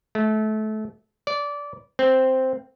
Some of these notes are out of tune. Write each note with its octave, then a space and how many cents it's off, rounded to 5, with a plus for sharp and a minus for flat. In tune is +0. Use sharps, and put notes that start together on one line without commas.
A3 -25
D5 -20
C4 -5